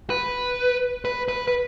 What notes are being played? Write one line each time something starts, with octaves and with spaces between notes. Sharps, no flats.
B4
B4
B4
B4